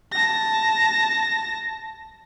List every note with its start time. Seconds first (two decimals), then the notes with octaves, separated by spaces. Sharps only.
0.12 A5 A#6